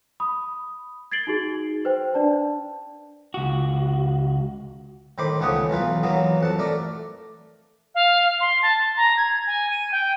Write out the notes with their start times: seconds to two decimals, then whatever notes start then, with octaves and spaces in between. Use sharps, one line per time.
0.20 B5 D#6
1.12 G#6 A6 C7 D7 F#7 G7
1.27 D#4 F#4 G#4
1.85 B4 C5 G5
2.14 D4 D5 A5
3.34 C#2 F#4
5.18 A2 D#3 C5 B5 D6
5.40 C#2 C#3 A3 B3 G#4 F#5
5.70 B1 E3 F4 B4
6.03 E3 F#3 A#3 B3
6.41 F2 F#5 A5
6.59 A3 A#4 D5
7.95 F5
8.40 C6
8.62 A5
8.97 A#5
9.17 G#6
9.47 G#5
9.70 D#7
9.92 G5